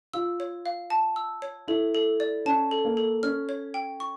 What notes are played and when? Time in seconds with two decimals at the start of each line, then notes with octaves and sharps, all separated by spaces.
0.14 F4 E6
0.40 C#5
0.66 F5
0.90 A5
1.16 E6
1.42 C#5
1.68 E4 A4
1.95 A4
2.20 D5
2.46 C#4 A5
2.71 A4
2.85 A#3
2.97 A4
3.23 C#4 F6
3.49 C#5
3.74 G5
4.00 C#6